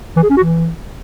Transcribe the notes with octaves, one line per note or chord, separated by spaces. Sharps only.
E3
G#4
C#4
F#4
E3